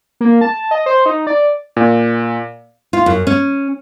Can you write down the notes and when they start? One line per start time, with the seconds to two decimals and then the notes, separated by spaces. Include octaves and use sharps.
0.21 A#3
0.41 A5
0.71 D#5
0.86 C5
1.06 D#4
1.27 D5
1.77 A#2
2.93 F4
3.06 F#2
3.27 C#4